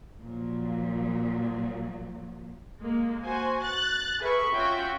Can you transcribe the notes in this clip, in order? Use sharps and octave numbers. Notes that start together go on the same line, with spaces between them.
A#2 F3 F#3
G#3 A#3
F#4 C5 G#5
F#6 A6
G#4 A#4 B4 E5 B5 C#6
C#4 F4 F#4 E5 G5